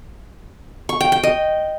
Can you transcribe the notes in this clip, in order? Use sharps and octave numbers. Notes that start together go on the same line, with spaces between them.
C#6
G5
G5
D#5